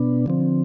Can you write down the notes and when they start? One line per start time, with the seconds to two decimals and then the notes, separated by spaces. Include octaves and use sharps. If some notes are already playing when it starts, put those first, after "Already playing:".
Already playing: B2 B3 D4
0.26 D3 F3 C4